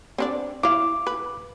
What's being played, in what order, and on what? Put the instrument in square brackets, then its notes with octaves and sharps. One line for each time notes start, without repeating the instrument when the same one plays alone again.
[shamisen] C4 D4 D5
[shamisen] E4 F5 [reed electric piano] D6
[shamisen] B4